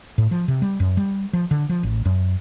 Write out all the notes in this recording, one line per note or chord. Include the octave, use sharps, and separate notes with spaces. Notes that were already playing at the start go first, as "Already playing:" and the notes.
A2
F3
C3
G3
F#2
G3
F3
D3
F3
A1
F#2